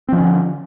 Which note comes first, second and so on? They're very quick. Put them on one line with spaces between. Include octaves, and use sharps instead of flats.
C4 F3 C#4 D3